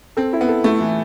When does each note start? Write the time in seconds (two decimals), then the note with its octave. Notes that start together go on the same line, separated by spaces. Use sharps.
0.17 C4 A4
0.33 E4
0.41 B3
0.49 A4
0.64 A3 E4
0.81 E3